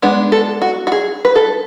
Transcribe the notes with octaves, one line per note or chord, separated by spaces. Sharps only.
G#3 B3 D4
A4
F#4
F#4
G#4
B4
A4